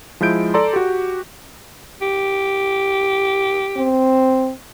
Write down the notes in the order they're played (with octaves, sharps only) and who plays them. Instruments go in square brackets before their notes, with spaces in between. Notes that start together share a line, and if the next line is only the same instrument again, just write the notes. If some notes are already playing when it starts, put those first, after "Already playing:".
[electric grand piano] F3 G#3 E4 G6 D7
A4 D5 A#5 C6
F#4 G4
[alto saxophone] G4
[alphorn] C4